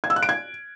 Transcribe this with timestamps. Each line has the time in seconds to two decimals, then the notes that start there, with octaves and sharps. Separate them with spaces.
0.04 G#6
0.10 E6
0.16 F#6
0.23 D7
0.29 G#6